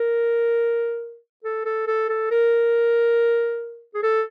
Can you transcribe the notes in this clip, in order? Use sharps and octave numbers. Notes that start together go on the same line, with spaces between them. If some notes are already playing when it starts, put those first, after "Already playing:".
Already playing: A#4
A4
A4
A4
A4
A#4
G#4
A4